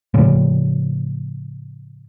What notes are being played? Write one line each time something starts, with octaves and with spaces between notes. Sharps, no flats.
A2 C#3 F3 C#4